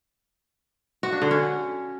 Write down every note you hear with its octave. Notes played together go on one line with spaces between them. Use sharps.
F#4
D4
D3
C#4